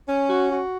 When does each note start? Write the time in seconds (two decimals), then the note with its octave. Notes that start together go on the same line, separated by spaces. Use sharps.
0.07 C#4
0.29 F#4
0.51 F#4